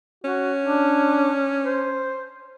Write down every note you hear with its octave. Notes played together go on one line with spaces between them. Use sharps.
C#4 F#4
D4
C5